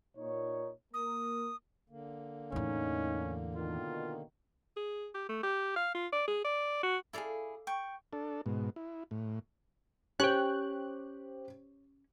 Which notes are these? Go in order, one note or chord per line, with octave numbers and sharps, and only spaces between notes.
A#2 D#4 C#5
A#3 A#4 D#6
D3 A#3
E2 A2 C#4 D#4
B2 D#3 F4
G#4
G4
A3
G4
F5
F4
D5
G#4
D5
F#4
E4 G#4 A4 D5 F5
G5 C#6
D4 A4
G#2 B2
E4
A2
C#4 G4 C5 C#5 G5 F#6